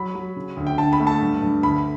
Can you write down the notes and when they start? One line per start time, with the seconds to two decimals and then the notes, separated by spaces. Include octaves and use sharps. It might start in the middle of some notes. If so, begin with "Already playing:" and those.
Already playing: F#3 B5
0.15 F#3
0.36 C#3
0.57 D2
0.67 G5
0.78 D3 A5
0.93 B5
1.00 A3
1.07 A5
1.21 G2
1.42 G2
1.63 D2 B5